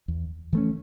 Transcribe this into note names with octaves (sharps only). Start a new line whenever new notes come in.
E2
E3 A3 C#4